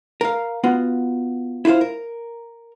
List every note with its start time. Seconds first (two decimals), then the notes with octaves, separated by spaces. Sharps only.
0.21 A#4 F5
0.64 B3 F4 F#4
1.65 E4 F4 B4 C5 F5
1.81 A#4